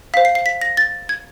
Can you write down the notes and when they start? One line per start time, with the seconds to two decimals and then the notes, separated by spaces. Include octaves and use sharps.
0.14 C5 F5 B6
0.25 C7
0.35 C7
0.46 B6
0.61 A#6
0.77 A6
1.09 G#6